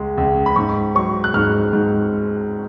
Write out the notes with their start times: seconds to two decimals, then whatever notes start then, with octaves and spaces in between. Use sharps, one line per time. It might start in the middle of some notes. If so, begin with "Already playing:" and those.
Already playing: C#2 G#3
0.17 C#2
0.46 B5
0.56 G#2 C#6
0.95 F#3 C#6
1.24 F#6
1.34 G#2 F6
1.73 G#2